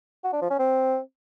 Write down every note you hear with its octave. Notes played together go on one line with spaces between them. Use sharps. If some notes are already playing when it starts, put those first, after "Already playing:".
F#4
D4
F3
C#4
C4